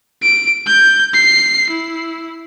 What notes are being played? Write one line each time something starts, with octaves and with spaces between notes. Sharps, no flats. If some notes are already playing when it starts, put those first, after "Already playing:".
D7
G6
C7
E4